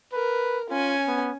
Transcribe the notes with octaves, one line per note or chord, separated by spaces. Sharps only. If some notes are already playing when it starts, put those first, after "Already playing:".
A#4 B4
C#4 F4 G#5
B3